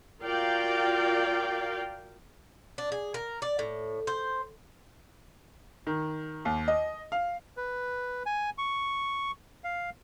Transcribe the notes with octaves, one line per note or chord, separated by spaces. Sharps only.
F4 F#4 A#4 D5 F5 G5
D4
G#4
A#4
D5
A2
C5
D#3
D#2
D#5
F5
B4
G#5
C#6
F5